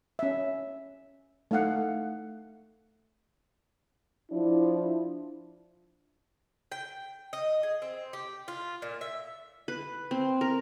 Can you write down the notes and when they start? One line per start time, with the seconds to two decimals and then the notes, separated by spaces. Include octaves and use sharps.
0.19 C#4 E5
1.51 A3 D#4 F5 F#5
4.31 F3 D4 E4
6.72 G5
7.33 D#5
7.63 G#4
7.82 C4
8.13 G4
8.48 F4
8.82 A#2
9.01 E5
9.68 B4
10.11 C4
10.41 A#4